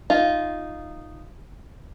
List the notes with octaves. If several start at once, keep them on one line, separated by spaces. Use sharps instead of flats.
D#4 F4